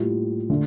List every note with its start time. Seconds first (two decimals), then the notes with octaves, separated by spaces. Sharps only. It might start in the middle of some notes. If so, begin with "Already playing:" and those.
Already playing: A2 G3 A#3 F4
0.50 D3 A3